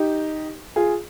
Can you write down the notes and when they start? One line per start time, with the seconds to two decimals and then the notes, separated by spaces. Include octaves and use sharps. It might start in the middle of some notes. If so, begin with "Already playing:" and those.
Already playing: D#4 G4
0.76 F4 G#4